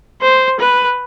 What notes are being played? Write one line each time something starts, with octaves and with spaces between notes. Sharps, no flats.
C5
B4